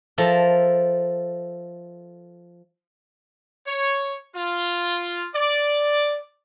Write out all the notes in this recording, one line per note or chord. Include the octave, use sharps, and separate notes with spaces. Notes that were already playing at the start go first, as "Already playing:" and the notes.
F3 A4 A#4 E5
C#5
F4
D5